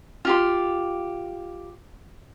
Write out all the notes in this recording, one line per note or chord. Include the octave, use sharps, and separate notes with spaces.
F4 G4 C6